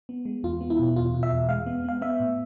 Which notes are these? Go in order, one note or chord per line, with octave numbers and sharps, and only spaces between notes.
B3
G#3
E2 F4
B3
E4
B2
E2 F4
B2
E5
E2
G#3 F5
B3
B3 F5
B3 E5
A2